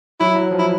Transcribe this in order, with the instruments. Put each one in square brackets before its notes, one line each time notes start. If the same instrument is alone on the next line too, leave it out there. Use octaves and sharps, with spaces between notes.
[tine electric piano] F#3 [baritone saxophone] E4
[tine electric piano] F#3
F3
[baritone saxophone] E4